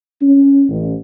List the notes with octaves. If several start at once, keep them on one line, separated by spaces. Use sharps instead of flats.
C#4
A1